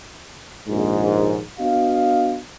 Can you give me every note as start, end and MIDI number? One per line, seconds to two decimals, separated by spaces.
0.68 1.40 34
0.68 1.40 39
0.68 1.40 44
1.59 2.37 59
1.59 2.37 62
1.59 2.37 66
1.59 2.37 75
1.59 2.37 77